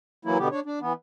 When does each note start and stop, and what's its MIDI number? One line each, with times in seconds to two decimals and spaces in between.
0.25 0.38 52
0.25 0.38 54
0.25 0.38 58
0.25 0.38 64
0.38 0.48 47
0.38 0.48 50
0.38 0.48 59
0.38 0.48 67
0.51 0.60 62
0.51 0.60 73
0.65 0.79 62
0.81 0.93 52
0.81 0.93 59